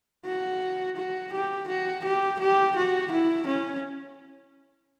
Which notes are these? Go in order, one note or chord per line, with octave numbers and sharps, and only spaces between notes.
F#4
F#4
G4
F#4
G4
G4
F#4
E4
C#4